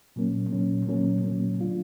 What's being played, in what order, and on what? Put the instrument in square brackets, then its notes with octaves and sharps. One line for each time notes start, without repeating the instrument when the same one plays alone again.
[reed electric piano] A#2 F#3 A#3 C#4
A#2 F#3 A#3 C#4
A#2 F#3 A#3 C#4
A#2 F#3 A#3 C#4
D3 F#3 A3 D4 F4